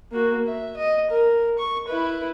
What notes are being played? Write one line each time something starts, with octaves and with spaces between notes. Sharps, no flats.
A#3 F#4
E5
D#5
A#4
C#6
E4 B4